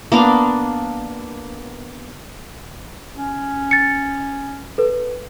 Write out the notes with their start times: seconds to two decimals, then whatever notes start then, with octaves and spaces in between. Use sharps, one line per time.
0.12 A#3 B3 D4 F5
3.16 C#4
3.71 A6 C#7
4.78 A4 B4